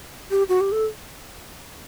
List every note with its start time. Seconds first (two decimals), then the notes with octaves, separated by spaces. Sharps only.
0.31 G4
0.49 F#4
0.61 G4
0.72 A4